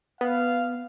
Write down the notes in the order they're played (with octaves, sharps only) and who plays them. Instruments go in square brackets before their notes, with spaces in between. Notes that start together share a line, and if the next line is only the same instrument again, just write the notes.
[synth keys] B3 [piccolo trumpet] F5